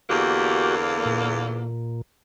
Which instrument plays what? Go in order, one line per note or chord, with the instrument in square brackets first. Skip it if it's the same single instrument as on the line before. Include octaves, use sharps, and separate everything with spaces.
[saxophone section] E2 D3 A#3 [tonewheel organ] F#4 G4
[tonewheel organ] A#2